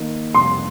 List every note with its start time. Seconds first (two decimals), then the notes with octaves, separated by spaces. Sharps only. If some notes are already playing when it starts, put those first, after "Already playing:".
Already playing: D#3 A#3 D#4
0.35 F2 C3 G3 C6